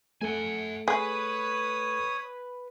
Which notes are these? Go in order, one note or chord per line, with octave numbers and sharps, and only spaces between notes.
A3 A4 F#5 G#5
G#4 B4 C#5 D#6